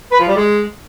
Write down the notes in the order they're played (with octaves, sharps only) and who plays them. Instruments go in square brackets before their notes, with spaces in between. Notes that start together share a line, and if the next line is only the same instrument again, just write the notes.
[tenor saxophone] B4
F3
G3
G#3